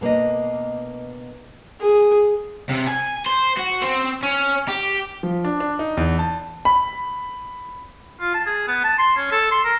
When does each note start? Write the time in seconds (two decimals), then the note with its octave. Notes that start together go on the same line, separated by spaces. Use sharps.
0.01 B2 A#3 D4 D#5
1.80 G#4
2.69 C3
2.88 G#5
3.26 C5
3.57 F#4
3.82 C4
4.23 C#4
4.68 G4
5.23 F3
5.45 D4
5.60 D4
5.79 D#4
5.97 E2
6.19 A5
6.65 B5
8.20 F4
8.34 A5
8.46 G#4
8.68 B3
8.84 A5
8.98 C6
9.17 C#4
9.31 A4
9.51 C6
9.64 A#4